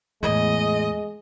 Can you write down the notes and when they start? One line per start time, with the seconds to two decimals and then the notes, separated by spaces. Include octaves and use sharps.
0.23 E2 A2 G#3 D#5